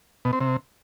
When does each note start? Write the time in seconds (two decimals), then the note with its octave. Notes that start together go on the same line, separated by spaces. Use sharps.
0.25 B2
0.33 C4
0.41 C3